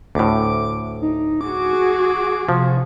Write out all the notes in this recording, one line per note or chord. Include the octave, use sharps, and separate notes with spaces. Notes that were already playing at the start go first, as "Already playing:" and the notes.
D2 A2 D6
D#4
F#4 G#4 D6
C3 F3